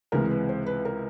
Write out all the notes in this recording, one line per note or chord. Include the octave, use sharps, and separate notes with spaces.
C#2 C3 E3 G#3 A#4
B4
C5
B4
A#4